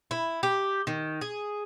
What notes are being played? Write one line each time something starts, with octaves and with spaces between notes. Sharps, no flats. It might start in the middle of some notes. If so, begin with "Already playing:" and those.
E4
G4
D#3
G#4